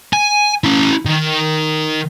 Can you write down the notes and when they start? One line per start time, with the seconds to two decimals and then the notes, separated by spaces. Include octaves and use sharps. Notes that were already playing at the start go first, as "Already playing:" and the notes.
0.13 G#5
0.64 C#4 E4
1.06 D#3